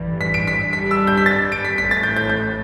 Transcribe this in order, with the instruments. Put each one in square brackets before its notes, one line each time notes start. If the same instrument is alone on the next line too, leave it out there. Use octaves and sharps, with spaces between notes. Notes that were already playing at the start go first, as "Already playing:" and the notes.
Already playing: [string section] A1 G2 E3
[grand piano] B6
D7
B6
[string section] G2 G3 D4 [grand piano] B6
[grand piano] E6
G6
B6
A6
D7
B6
[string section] A1 A2 A3 [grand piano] B6
[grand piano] A6
G6
G6
G6